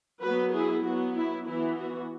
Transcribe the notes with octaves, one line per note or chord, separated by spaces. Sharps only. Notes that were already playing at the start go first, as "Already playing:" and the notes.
F#3 B3 F#4 B4
E4 G#4
F#3 B3 F#4
E4
E3 B3 E4
F#4